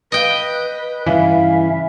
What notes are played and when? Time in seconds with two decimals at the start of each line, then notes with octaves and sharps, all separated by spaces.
0.12 B4 D#5 G5
1.06 G2 C#3 E3 C#4 E4 E5 F5